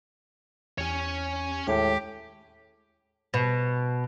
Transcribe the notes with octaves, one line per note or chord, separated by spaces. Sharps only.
E2 C#4 G4 C#5 G#5
D#2 A2 G#3 G4 G#4
B2